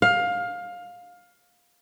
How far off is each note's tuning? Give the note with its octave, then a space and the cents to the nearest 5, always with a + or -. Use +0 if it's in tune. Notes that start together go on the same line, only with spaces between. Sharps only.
F5 +20